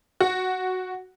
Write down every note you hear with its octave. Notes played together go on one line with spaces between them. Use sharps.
F#4